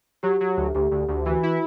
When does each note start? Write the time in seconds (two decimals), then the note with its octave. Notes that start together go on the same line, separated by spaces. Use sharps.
0.23 F#3 G4
0.41 F#3
0.57 D2
0.75 D2 G4
0.91 D2
1.08 D2
1.26 E3 F#4
1.43 E4